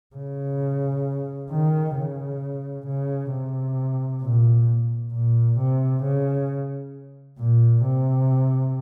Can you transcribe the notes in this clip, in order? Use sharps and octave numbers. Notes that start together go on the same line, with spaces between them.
C#3
D#3
C#3
C#3
C3
A#2
A#2
C3
C#3
A#2
C3